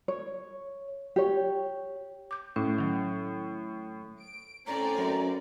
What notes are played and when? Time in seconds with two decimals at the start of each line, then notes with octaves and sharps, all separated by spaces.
0.08 C#5
1.16 G4 C#5
2.31 D6 G6
2.56 A2 C#4
2.78 D#3 F#3
4.20 D7
4.67 A2 D3 C4 C#4 D5 A#5 D6
4.98 F#2 A#4 D#5 F5